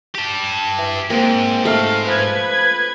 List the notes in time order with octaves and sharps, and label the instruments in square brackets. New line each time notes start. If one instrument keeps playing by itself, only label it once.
[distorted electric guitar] G4 A5
[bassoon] E3
[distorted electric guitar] G#2 [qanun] A#3 [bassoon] C4
[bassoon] C3 [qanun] A3 [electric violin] F5
[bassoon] F3 [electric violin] B4 G#6